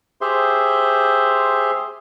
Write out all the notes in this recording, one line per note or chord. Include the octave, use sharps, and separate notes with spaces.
G4 G#4 C5 E5 C6